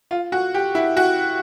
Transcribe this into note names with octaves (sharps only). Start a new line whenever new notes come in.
F4
F#4
G4
E4
F#4